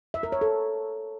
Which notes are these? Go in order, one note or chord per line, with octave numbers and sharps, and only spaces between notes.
E5
A#4
C#5
A4